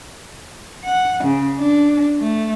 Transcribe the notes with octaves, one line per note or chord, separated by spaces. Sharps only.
F#5
C#3
D4
A3